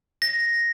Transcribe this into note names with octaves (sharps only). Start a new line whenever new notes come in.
A#6